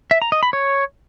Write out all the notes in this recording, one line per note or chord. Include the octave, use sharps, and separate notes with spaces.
E5
A#5
D#5
B5
C#5